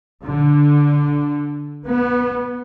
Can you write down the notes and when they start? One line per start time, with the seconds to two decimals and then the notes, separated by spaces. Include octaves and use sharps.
0.24 D3
1.85 B3